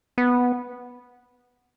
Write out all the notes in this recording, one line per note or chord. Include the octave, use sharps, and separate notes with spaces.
B3